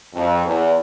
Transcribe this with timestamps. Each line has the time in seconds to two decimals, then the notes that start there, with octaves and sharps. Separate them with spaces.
0.14 F2
0.45 E2